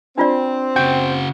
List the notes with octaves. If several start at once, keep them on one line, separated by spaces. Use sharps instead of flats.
C4 D4 F4 D5
C#3 F#4 G5